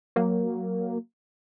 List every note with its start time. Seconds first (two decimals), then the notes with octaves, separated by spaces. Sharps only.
0.16 F#3 A#3